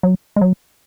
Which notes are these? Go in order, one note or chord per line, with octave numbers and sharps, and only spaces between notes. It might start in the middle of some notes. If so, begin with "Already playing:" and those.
F#3
G#3
F#3